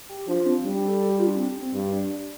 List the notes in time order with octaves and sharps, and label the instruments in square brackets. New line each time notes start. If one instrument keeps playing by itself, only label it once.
[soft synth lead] G4
[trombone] F3 [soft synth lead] D4
[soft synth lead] C4
[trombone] G3 [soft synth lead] D4
[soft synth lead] G4
A4
A4
G4
F4
D4
C4
C4
[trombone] G2
[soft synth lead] D4
D4